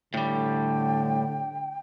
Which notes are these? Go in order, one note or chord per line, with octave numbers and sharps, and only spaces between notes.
A2 D3 G3 G5